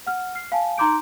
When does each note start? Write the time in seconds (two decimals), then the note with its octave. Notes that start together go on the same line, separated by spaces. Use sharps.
0.06 F#5 F6
0.35 F6 C7
0.52 F5 G#5 A5
0.78 D#4 A#5 C6 D6 G6 D7